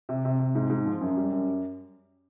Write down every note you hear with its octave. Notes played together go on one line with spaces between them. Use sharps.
C3
C3
C3
G#2
G#2
F3
F#2
G3
F#2